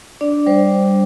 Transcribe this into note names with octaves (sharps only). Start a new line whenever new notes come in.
D4 D5
G3 C5